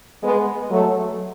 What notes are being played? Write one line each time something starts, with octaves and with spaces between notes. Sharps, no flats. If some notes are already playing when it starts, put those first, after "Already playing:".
G#3 B3
F#3 A3